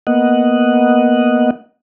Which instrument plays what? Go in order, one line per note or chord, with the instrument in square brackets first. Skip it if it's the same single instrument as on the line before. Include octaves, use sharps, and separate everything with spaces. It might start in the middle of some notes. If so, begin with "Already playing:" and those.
[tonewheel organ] A#3 B3 D#5 F#5